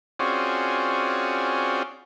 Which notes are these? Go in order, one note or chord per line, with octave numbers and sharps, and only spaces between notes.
C4 C#4 F4 F#4 G#4 D5